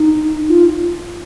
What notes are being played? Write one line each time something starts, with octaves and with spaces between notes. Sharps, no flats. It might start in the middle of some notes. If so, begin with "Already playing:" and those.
Already playing: D#4
F4